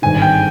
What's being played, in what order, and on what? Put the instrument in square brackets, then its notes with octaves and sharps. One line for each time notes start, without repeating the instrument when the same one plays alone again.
[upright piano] G#1 G2 D3 [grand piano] G#5
[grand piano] G5